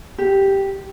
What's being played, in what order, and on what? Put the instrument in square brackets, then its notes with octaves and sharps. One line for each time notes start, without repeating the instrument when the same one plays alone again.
[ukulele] G4